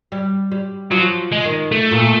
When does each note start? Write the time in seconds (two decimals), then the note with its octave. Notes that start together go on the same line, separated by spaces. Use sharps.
0.12 G3
0.52 G3
0.91 F3 F#3
1.32 G#3
1.45 D#3
1.72 A3
1.91 A#2